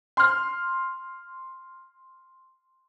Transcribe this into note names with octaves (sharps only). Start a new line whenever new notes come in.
C6 F6